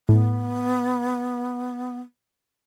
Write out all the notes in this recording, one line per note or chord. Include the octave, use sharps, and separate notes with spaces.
A2 B3